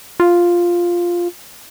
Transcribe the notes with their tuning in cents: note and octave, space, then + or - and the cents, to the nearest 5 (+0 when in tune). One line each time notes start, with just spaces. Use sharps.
F4 +0